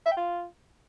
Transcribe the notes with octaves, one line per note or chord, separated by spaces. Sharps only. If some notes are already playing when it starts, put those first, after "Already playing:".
E5
G5
F4